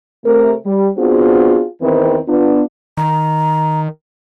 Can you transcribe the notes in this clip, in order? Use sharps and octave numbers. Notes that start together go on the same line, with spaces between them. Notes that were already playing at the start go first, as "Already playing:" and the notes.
C3 A3 A#4
G3
B3 C4 D4 F4 F#4 G#4
E2 D#3 E3 C4
B3 D4 F4
D#3 A#5